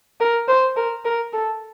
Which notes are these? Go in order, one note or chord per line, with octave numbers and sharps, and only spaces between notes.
A#4
C5
A#4
A#4
A4